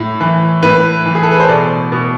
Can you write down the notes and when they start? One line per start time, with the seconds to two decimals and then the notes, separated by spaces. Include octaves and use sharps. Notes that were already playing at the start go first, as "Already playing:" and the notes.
Already playing: A2
0.21 E3
0.63 A2 B4
1.06 E3
1.15 G#4
1.23 A4
1.31 B4
1.40 C5
1.48 B2 D5
1.92 B2